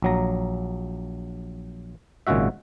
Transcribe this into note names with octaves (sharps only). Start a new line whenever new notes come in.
A#1 F#3 A#5
G#1 A#2 C#3 G#3 F#4 E5